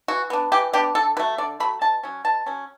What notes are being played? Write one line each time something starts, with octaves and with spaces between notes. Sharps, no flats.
E3 F#4
B3 D4
E3 G4
B3 D4 G4
D3 A4
F#3 A3 B4
D3 D5
F#3 A3 B5
B2 A5
F#3 C#4
B2 A5
F#3 C#4